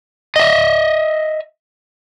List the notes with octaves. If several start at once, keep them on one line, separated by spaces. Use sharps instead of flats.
D#5 E5